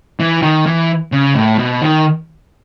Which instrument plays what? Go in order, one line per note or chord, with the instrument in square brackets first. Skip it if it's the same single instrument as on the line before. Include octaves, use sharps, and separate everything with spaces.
[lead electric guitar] E3
D#3
E3
C#3
A2
B2
D#3